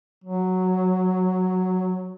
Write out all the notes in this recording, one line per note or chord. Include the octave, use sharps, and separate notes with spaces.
F#3